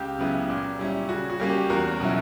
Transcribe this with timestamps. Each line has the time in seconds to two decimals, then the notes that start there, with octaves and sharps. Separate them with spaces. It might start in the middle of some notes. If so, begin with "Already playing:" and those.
Already playing: C#2 G4
0.18 C#3 F#3 B3 E4
0.49 A#2
0.79 G3 C#4 E4
1.09 C#3 F#4
1.30 F#4
1.40 G3 A#3 C#4
1.50 G4
1.70 E2 F#4 A#4
2.00 B2 F#3 C#4 E4